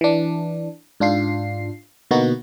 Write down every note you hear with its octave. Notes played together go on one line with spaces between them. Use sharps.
E3 D4
G#2 D4 F4 C7
B2 D3 A#3 B3 D#4 F#4